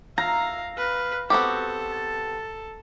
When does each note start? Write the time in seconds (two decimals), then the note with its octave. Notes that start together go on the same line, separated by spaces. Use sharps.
0.18 E5 F5 A#5
0.77 B4 F5
1.30 B3 C4 F#4 G4 A4
1.92 A5